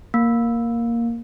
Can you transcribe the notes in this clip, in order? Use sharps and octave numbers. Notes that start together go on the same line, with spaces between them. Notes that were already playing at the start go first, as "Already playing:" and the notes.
A#3